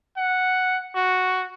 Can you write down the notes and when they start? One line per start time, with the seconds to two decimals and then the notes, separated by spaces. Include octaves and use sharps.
0.18 F#5
0.96 F#4